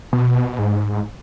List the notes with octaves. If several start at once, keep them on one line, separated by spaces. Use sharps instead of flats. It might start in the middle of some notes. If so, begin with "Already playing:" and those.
B2
G#2